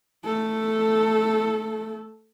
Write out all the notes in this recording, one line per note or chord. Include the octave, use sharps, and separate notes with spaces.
A3 A4